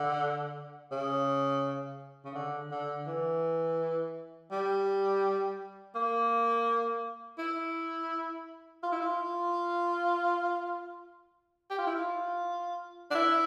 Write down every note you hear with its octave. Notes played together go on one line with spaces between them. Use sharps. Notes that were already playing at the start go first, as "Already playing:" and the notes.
Already playing: D3
C#3
C#3
D3
D3
E3
G3
A#3
E4
F4
E4
F4
G4
F4
E4
F4
D4
E4